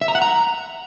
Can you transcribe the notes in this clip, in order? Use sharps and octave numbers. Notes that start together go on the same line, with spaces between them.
E5
A#5
F#5
A#5